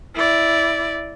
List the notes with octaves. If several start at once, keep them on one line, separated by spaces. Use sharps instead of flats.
E4 D5